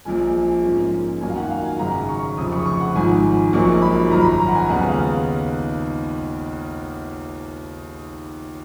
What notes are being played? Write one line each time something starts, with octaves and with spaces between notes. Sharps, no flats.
A#1 A#2 F3 G#3 G#5
G#2 F3 A#3 C#4
F#2 D#3 F#3 A#3 G#5
F5
F#5
F5
G#5
G#1 F#2 C#3 A#5
C#6
F1 F2 C#3 D#6
C#6
C#6
F#5
G#1 G#2 F3 G#5
A#1 A#2 F#3 A#3 D#4 C#6
B5
G#1 F#2 F3 A#5
B5
A#5
A#5
F#5
G#5
D#2 C#3 G#3 B3 D#4 F#5
F5